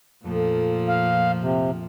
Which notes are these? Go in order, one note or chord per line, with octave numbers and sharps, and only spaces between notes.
F2 A#2 F3 A3
F5
C3